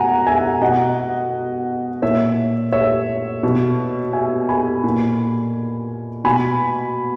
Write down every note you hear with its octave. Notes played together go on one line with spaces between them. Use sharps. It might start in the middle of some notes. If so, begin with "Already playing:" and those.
Already playing: B2 F#5 G#5 A#5
E5 G#5
B2 D#5 F#5
A#2 C#5 E5
C#5 E5
B2
E5 G#5
G#5 B5
A#2
B2 G#5 B5